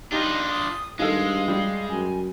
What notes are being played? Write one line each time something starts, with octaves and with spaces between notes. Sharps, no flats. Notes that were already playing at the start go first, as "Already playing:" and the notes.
D4 D#4 F4 G4
D#6
G2 D#3 G#3 A4 F5
G3 F4
F#2 G#5